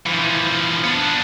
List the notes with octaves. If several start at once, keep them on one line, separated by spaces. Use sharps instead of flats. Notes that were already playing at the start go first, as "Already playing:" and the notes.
E3 F3
B3 D4